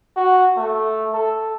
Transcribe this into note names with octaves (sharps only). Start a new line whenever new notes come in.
F#4
A3
A4